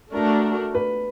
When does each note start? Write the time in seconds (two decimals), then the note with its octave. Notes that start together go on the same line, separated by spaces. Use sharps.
0.12 A3 D4 F#4 A#4
0.75 B4